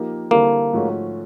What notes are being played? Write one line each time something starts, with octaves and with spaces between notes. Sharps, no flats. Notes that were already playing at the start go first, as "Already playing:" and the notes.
Already playing: F3 A#3 D#4 G4 A#4
D3 G3 A#3 C4 E4 A4
G#2 F3 A3 C#4 F#4